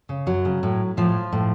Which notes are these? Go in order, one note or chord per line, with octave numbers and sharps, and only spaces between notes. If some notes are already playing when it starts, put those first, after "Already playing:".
C#3
F#2 F#3
C#3
A2
A2 F3
A2